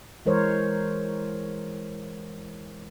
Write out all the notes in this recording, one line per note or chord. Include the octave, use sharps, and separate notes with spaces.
E3 G#3 A#4 C5 C#5